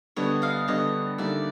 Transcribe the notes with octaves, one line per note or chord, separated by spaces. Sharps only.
D3 G3 B3 D4 C#5 D#5
D#5 F5
D3 G3 B3 D4 C#5 D#5
D3 G3 A#3 D#4 D5 E5